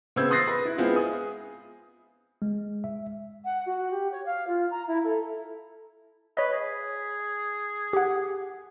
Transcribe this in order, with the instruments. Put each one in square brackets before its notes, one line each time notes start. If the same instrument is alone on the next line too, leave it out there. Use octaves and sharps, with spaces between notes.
[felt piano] C#3 B3 C4 C5 E6 G#6
C6 D#6 F#6 A6 A#6 C7
B4 B5
E4
G#3 B3 C4 E4 F4
G#4 D#6
[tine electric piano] G#3
E5
[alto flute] F#5
F#4
G4
C#5
F5
F4
A#5
E4
A4
[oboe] B4 [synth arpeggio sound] C#5 D#5
[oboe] G#4
[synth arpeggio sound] G4 F#5